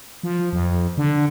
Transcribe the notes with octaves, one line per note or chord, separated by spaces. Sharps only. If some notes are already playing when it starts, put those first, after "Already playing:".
F3
F2
D3